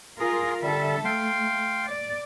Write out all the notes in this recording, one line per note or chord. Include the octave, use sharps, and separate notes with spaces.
F4 G#4 A#4
D3 G3 A4 E5
A3 F5 G5 C6
D5